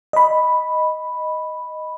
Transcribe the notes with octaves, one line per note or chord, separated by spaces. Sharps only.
D#5 B5